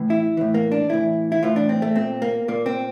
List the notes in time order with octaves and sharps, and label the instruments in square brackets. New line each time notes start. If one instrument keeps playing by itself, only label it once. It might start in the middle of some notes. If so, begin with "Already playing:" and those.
Already playing: [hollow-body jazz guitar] A2 E3
E4
A2 E3
A#3
D4
A2 E3 E4
E4
A2 E3 F4
D4
C4
A3
A#2 C4
A#3
A#2 A#3
C4